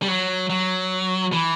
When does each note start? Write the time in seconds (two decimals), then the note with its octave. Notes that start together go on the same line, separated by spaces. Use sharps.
0.02 G3
0.08 F#3
0.50 F#3
1.33 E3